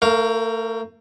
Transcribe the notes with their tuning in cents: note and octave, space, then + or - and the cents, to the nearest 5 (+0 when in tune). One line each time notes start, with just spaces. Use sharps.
A3 +35 A#4 +0 F5 +0